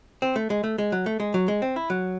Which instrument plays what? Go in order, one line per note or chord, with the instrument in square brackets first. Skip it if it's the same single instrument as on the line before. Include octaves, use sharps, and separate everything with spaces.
[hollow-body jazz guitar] C4
A3
G#3
A3
G#3
F#3
A3
G#3
F#3
G#3
C4
E4
F#3